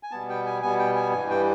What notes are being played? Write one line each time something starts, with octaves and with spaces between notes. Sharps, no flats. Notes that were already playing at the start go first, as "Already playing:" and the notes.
G#5
B2 G3 B3 A5
G5
G#5
B2 G3 B3 G#5
G5
G#5
G2 E3 G3 G#5
G5